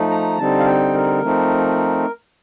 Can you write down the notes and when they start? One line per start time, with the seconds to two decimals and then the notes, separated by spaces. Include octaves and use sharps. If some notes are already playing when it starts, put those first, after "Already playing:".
Already playing: F3 A3 D#4
0.10 A#5
0.37 D3 G3 C4 D#4 A5
0.59 F5
0.66 G5
0.94 A#4
1.22 F3 A3 C4 D#4